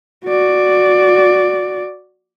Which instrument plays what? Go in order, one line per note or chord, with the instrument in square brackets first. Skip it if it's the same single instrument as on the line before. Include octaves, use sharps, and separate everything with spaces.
[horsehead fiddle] F#4 D5